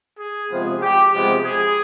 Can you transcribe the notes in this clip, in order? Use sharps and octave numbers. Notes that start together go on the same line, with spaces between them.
G#4
C3 F3 G#3 B3
G4
C3 F3 G#3 B3 G4
G#4